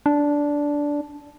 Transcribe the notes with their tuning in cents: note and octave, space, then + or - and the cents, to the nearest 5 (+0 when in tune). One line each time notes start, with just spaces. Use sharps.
D4 -10